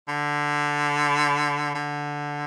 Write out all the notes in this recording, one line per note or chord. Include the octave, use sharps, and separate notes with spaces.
D3
D3